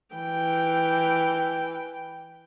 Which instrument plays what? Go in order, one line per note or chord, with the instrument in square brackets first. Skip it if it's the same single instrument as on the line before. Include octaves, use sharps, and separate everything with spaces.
[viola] E3 G5